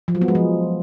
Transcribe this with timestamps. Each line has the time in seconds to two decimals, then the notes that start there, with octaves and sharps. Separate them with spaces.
0.08 F3
0.15 F#3
0.21 B3
0.28 G#3
0.35 F3